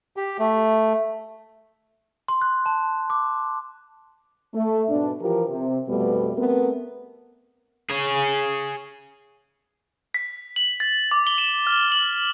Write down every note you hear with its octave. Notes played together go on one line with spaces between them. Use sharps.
G4
A3
C6
F#6
A5
D6
A3
G#2 B2 B3 D4
E3 F3 G4 A#4
C3
F2 B2 G3 A3 B3
A3 B3 C4 A#4
G#4 C#5
B6
F#7
A6
D6
G7
E7
F6
F#7